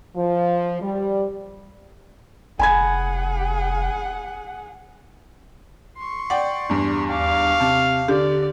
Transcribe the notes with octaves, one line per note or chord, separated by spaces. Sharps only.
F3
G3
F1 G#4 F#5 G#5 B5 G#6
C6 C#6
D5 F#5 G5
E2 G2
D#2 F5 C#6 D6
C3 A5
D3 G4 D5